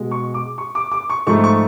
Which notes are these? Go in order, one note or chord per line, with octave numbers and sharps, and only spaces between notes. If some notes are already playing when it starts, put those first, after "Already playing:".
Already playing: B2 G#3
C#6
D6
C#6
D6
D6
C#6
G#2 F3 A3 C#6
C#6